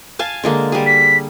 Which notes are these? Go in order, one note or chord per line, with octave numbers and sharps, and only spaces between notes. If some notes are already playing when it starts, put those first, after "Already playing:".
F5 G#5 A5
D3 G#3 A#3
G3 G#4
B6